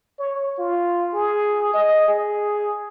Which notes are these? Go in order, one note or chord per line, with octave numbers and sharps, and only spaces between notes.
C#5
F4
G#4
D#5
G#4